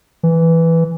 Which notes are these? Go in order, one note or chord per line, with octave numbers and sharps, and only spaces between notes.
E3